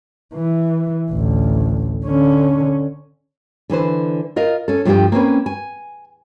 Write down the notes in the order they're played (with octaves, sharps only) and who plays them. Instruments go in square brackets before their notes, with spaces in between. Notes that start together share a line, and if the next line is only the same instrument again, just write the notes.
[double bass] E3
A1 D2
D3 C#4
[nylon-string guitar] D3 E3 B4 C5
F4 A#4 D#5 F5
C#4 A4
G2 F3 A3 F4 G4 G5
A#3 C4 C#4 B4
G#5